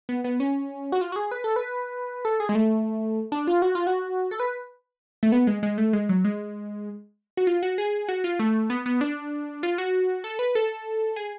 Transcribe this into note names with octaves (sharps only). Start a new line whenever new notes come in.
B3
B3
C#4
F#4
F4
F#4
G#4
B4
A4
B4
A4
G#4
G#3
A3
D4
F4
F#4
F4
F#4
A4
B4
A3
B3
G#3
G#3
A3
G#3
F#3
G#3
F#4
F4
F#4
G#4
F#4
F4
A3
B3
B3
D4
F4
F#4
A4
B4
A4
G#4